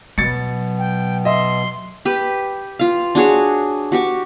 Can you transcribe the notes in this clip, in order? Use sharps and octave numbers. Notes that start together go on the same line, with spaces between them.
B2 F#3 A6 C#7
G5
D#5 E5 C6
G4 B4
F4 F5
D4 F#4 G#4 C#5
F#4 G4 C#6 D6